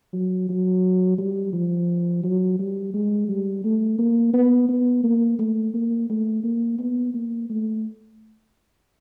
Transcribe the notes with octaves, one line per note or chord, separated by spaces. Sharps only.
F#3
F#3
G3
F3
F#3
G3
G#3
G3
A3
A#3
B3
B3
A#3
A3
A#3
A3
A#3
B3
A#3
A3